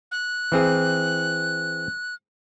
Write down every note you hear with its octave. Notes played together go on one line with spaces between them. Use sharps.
F#6
E3 C4 G#4